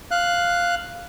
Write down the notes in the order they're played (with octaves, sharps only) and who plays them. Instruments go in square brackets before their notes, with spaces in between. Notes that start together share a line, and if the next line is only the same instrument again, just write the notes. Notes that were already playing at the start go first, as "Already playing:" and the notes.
[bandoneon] F5 F#6